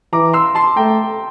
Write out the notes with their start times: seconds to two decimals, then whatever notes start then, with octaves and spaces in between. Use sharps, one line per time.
0.13 E3 A#5 D6
0.33 C6 E6
0.55 A5 C6
0.76 A3 G5 A#5